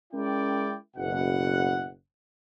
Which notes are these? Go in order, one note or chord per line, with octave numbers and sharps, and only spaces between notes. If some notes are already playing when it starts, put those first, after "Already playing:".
G#3 C#4 E4 A#4 D5 G5
F#1 B2 F#5